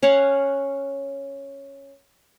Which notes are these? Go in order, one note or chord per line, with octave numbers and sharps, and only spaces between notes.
C#4 C#5 F5 F#5